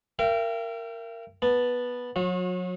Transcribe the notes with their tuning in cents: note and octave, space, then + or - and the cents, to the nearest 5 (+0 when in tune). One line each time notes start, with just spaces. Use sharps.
A#4 -10 E5 +45 G5 -20
B3 -10 A5 +0
F#3 -30 F#4 -45